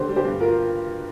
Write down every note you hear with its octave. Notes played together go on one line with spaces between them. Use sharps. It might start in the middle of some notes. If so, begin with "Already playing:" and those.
Already playing: D3 G4 C5
G3
G4 C5
G2
F4 A#4